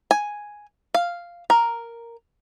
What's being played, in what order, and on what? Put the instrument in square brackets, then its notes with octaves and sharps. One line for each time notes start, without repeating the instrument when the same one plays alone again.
[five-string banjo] G#5
F5
A#4